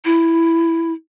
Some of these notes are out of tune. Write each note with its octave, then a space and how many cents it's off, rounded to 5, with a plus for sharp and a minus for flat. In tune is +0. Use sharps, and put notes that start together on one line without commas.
E4 +5